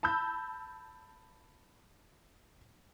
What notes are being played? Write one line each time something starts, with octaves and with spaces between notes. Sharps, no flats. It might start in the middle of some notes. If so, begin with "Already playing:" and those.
A5 B5 E6 G6